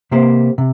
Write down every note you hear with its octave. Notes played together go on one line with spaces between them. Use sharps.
C3 A#3 G4 C5
C3